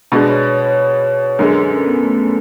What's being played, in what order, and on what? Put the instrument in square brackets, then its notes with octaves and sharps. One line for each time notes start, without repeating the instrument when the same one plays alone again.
[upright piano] B2 G#3 B3 D4 [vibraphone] B4
[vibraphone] C#5
C#5
C#5
[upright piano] F#2 D3 G#3 [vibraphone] B4
[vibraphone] A4
C#4
B3
B3
A3